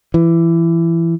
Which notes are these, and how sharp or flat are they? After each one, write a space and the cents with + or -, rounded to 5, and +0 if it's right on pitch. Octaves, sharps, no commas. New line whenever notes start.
E3 +20